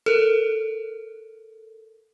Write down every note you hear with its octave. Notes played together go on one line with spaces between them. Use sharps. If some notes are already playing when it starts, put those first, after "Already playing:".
A4 A#4